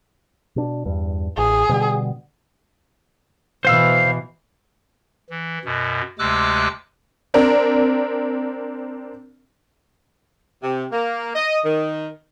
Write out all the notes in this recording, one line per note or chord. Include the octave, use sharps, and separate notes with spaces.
B2 D4
E2 G2
A1 G#4
B2 D3 G3
B2 E3 C5 F5 E6
E3
F#2 B2
D2 C3 G#3 D6 E6 F#6
C4 D4 A#4
C3
A#3
D#5
D#3